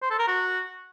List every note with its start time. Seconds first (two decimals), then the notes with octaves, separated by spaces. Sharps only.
0.02 C5
0.11 A4
0.19 A#4
0.28 F#4